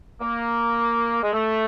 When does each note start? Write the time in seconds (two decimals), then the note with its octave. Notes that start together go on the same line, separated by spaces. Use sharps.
0.21 A#3
1.23 G#3
1.33 A3